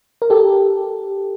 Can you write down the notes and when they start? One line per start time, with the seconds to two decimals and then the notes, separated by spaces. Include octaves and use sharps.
0.22 A#4
0.30 G4 A4